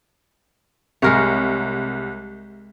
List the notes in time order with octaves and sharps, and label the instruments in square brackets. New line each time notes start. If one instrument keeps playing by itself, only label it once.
[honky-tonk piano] C2 [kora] G#3 A#4 C#5